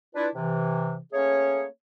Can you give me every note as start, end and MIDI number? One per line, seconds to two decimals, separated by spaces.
0.15 0.28 62
0.15 0.28 64
0.15 0.28 65
0.15 0.28 71
0.35 0.98 48
0.35 0.98 52
1.13 1.65 57
1.13 1.65 58
1.13 1.65 61
1.13 1.65 68
1.13 1.65 73